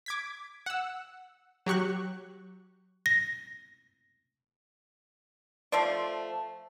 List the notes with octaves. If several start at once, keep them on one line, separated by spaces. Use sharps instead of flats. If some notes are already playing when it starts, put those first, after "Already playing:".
D6 G#6 B6
F#5 E6
F#3 G4 C#6 F#6
A#6
F3 A3 C5 D5